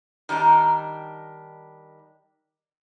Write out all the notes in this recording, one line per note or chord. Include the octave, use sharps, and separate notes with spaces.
D#3 G3 D4 D#4